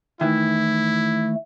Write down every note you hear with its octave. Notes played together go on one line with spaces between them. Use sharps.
D#3 E3 A3 E4